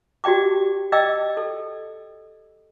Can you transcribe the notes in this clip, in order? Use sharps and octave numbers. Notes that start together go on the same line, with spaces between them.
F#4 G4 D5 G5 D6
D5 D#5 G5 D6 E6
A4